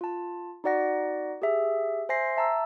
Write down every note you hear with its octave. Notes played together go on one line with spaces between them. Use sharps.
F4 A5
D#4 F#4 D5 F#5 A#6
G4 G#4 E5
C5 E5 G#5 C6 A#6 C7
E5 A5 A#5 E6